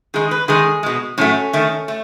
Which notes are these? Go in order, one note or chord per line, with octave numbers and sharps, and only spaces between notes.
D#3 G#3 G#4
B4
D#3 G#3 G#4
B2 G#3
A2 F#3 A3 C#4
D#3 A3
A3